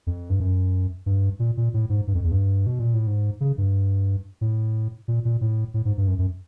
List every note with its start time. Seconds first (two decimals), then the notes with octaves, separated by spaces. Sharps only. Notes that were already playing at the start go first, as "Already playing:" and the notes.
0.07 F2
0.30 G2
0.40 F#2
1.06 G2
1.39 A#2
1.57 A#2
1.74 A2
1.89 G#2
2.07 G2
2.14 F2
2.24 E2
2.31 G2
2.66 B2
2.79 A#2
2.94 A2
3.07 G#2
3.41 C#3
3.58 G2
4.41 A2
5.08 A#2
5.25 A#2
5.41 A2
5.74 A2
5.85 G#2
5.97 G2
6.08 F#2
6.19 F#2